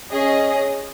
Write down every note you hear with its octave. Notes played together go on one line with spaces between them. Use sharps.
C#4 G#4 D#5